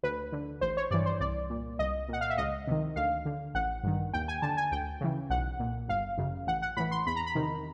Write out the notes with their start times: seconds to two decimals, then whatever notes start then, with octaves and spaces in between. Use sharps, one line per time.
0.03 D2 B4
0.32 D3
0.61 A1 C5
0.77 C#5
0.91 G2 E3 D5
1.06 C5
1.20 C2 D5
1.50 A#2
1.79 C2 D#5
2.08 A#2 F#5
2.21 F5
2.30 E5
2.38 C#2 D#5
2.67 C3 D#3
2.96 D2 F5
3.25 D3
3.55 A1 F#5
3.83 G2 D#3
4.13 D#2 G5
4.28 G#5
4.42 D3 A5
4.57 G#5
4.72 D2 G5
5.01 C#3 E3
5.30 B1 F#5
5.59 A#2
5.88 G1 F5
6.18 F#2 C#3
6.47 A1 F#5
6.62 F#5
6.77 A2 E3 B5
6.91 C6
7.06 E2 B5
7.16 A#5
7.26 B5
7.35 C3 D#3